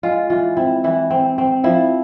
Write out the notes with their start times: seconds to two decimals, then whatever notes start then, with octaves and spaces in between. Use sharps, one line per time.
0.03 G#3 F4
0.30 E3 F4
0.57 C4 E4
0.84 E3 E4
1.10 C4
1.38 C4
1.64 F3 E4